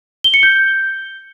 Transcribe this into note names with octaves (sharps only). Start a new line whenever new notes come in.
G7
C#7
G6